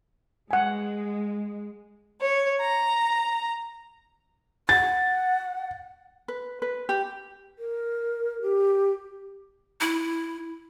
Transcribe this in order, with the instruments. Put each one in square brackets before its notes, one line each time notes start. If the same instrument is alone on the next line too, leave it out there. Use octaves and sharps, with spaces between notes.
[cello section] G#3 [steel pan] F#5 G#5
[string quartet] C#5
A#5
[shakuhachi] F#5 [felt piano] A6
[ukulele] B4
B4
G4
[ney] A#4
G4
[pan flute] E4